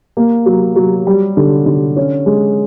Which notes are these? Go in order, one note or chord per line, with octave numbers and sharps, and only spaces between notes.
A#3
F#3
F#3
G3
D3
D3
C#4
G#3